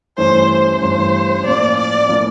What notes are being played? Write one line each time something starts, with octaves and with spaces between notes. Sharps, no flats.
G2 E3 A3 C#4 C5
C5
G2 E3 A3 C#4
A2 F3 A#3 C#4 D5
D5
A2 F3 A#3 C#4